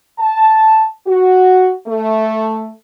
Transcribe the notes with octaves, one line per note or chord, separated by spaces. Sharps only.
A5
F#4
A3